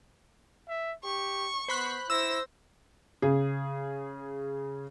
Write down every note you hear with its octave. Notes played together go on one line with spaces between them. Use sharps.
E5
G4 C#6
B3 C5 B5 F#6
E4 C5 E6 A#6 E7
C#3 G#4